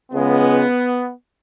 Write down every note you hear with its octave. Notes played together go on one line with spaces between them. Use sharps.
C#2 C#3 G#3 B3